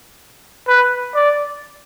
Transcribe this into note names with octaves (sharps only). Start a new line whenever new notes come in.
B4
D5